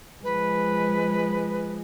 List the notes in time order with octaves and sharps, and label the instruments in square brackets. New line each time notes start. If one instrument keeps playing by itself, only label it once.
[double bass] F3 G#3 [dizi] B4